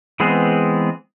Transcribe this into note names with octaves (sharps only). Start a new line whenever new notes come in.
E3 G#3 B3 C4 G#4